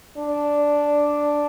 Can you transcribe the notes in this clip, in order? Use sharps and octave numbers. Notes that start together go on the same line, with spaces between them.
D4